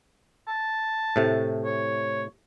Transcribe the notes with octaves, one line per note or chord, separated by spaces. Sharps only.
A5
A2 C3 A3
C#5